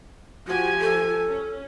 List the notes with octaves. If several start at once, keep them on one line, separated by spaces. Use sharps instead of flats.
F3 F#4 G4 G#5
A4
C#4